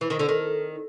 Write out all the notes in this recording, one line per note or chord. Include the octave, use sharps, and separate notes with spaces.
E3
D#3
D3
D#3